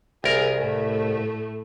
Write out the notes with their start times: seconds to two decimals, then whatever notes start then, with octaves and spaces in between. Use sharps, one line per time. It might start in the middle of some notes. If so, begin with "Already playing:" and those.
0.24 C2 G#4 A#4
0.60 A2 A3